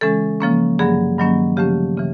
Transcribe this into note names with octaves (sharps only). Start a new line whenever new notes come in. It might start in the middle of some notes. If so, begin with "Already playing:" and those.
C#3 E3 G#3 C#4 A4
C#3 F3 A#3 C#4
G2 D3 F#3 A#3 G#4
G2 D#3 F#3 A#3 C#4
C#3 F3 A3 C#4 G4
C#3 E3